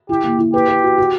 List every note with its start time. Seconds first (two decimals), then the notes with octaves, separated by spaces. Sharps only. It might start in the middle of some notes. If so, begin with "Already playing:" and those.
0.09 E4 G4
0.24 A#3
0.39 E4
0.53 G4 B4
0.69 B4
0.83 F#4
0.98 F#4